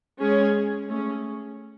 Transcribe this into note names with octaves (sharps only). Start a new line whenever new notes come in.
G#3 C#4 G#4 C#5
A3 C#4 G#4